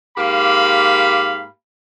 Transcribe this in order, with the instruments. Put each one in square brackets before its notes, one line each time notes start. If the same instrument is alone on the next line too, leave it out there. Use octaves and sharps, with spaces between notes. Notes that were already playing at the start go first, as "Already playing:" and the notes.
[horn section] G#2 A#3 G4 F5 B5